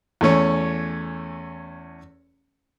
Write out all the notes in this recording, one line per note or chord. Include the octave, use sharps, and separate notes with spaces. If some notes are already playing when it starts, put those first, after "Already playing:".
E2 A3 C#4 C#5